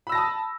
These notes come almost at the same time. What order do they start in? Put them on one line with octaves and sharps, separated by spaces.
B5 E6 A#6 A5 D#6